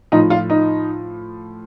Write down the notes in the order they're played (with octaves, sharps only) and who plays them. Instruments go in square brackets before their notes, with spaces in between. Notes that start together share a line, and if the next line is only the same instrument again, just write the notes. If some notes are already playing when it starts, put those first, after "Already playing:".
[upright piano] A2 F3 D#4
F4
D#4